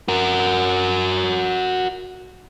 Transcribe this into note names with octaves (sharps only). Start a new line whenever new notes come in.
F#4 A#4